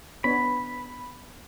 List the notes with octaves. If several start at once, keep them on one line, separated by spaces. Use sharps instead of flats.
B3 D4 C#5 B5